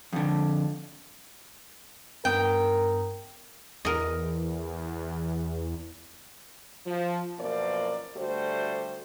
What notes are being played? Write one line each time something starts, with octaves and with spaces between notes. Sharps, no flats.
F2 D3
G2 B3 A#4 G5 D#6
E2 A#4 D#5
F3
F#2 B2 F3 A#3 C5 D5
D2 G3 A3 F#4 C5